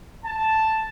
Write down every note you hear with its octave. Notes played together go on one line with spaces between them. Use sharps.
A5